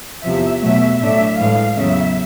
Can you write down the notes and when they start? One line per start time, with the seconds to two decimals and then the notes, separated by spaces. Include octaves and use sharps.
0.23 E2 C3 F3 E5
0.61 B2 F#3 A3 E5
1.00 A2 F#3 A3 D4 E5
1.38 A2 E3 G#3 F5
1.77 E2 C#3 F#3 E5